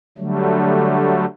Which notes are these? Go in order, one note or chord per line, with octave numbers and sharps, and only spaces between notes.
D3 F#3 G3 A3